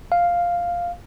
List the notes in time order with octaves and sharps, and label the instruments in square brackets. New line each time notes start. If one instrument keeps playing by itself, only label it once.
[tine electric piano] F5